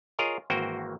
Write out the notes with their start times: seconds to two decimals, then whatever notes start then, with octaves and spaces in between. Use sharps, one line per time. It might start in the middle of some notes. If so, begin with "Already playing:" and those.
0.19 F4 G#4 A#4 C#5 D#5
0.50 G#1 E3 A#3 F#4 C5 G5